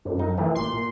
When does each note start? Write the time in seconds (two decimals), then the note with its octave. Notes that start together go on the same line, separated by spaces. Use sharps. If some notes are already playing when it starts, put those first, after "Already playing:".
0.05 F#2
0.17 G2 D#4
0.38 E3 F3 A3
0.55 A1 A#2 C6
0.73 A#2